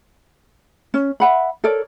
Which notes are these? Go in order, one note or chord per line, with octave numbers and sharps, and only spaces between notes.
C#4
E5 F#5 B5
A4 A#4 C#5 D5